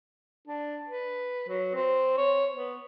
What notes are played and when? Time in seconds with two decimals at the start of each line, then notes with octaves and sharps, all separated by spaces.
0.48 D4
0.88 B4
1.49 F#3
1.75 C4
2.17 C#5
2.55 B3